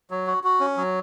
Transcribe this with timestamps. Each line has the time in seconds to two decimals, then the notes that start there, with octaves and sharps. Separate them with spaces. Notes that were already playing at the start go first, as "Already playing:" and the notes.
0.11 F#3
0.27 F#4
0.44 F#4
0.60 C#4
0.77 F#3